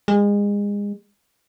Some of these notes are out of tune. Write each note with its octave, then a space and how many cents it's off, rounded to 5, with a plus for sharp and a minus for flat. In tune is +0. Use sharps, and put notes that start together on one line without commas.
G#3 -30